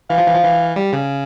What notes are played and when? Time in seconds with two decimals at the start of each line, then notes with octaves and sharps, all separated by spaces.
0.10 E3 F5
0.18 F3
0.27 E3
0.34 F3
0.43 E3
0.76 G3
0.93 C#3